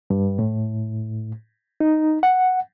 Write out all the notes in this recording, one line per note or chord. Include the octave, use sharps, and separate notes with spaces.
G2
A2
D#4
F#5